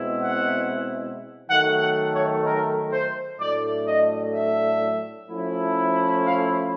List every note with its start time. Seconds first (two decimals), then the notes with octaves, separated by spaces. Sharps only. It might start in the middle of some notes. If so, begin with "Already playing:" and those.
Already playing: B2 G#3 C4 E4
0.23 F#5
1.49 D#3 F#3 A3 F#5
1.81 F#5
2.12 C#5
2.44 A#4
2.91 C5
3.39 A2 F#3 A3 D4 D5
3.87 D#5
4.34 E5
5.29 F3 A3 C#4 E4
6.25 F5